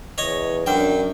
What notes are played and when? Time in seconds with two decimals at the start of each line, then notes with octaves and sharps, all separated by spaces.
0.18 E2 C#5 D#5
0.66 F#2 D4 G5